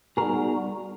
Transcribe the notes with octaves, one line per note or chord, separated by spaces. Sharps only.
G3 B3 D#4 F#4 G#4 A#4